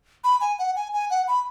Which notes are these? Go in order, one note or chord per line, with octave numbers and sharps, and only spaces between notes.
B5
G#5
F#5
G#5
G#5
F#5
B5